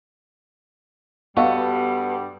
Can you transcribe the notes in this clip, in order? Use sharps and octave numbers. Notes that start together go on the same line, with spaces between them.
G2 G3 B3 F#4 A4 D#5 F5 C#6